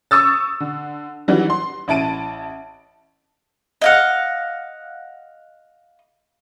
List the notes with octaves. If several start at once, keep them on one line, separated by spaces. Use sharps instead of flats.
C#6 D#6 E6 A6
D3
D#3 E3 F#3 G3
C6
A1 E4 A5 D7 D#7
D#5 F5 F#5